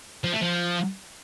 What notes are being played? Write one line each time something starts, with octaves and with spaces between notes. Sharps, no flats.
F3
A3
F3